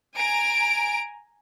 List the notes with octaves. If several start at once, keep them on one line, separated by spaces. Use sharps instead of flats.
G#5 A#5 D7